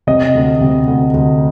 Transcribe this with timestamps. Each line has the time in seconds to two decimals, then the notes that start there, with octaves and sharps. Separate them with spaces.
0.07 C3 D#5
0.35 D2
0.61 C3
0.87 D2
1.14 D2